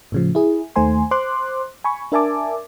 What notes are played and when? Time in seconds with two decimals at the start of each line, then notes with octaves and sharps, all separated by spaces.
0.12 A2 C#3 F3
0.35 E4 G#4
0.76 D#2 D#3 A3 C5 G#5 C6
1.11 C5 C6 D6 F#6
1.84 G#5 B5 C#6
2.12 D4 A#4 E5 G#5 A5 D6